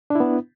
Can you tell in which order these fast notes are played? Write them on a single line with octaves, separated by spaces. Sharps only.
D4 E4 B3